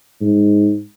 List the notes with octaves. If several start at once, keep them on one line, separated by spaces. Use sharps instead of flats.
G#2